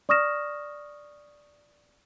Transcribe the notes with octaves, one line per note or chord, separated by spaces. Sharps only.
D5 C#6 D#6 F6 A#6 E7